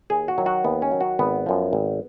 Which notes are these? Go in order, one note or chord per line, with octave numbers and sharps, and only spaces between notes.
D#2 G#4
F#4
D#3 F#3
F#4
D#2 B3
C#4
D#3 F#3
F#4
G#1 B3
F#2 F3
G#1